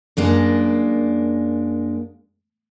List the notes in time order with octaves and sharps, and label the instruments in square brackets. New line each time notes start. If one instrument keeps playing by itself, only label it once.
[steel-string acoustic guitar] F#2 G#3 A#3 D4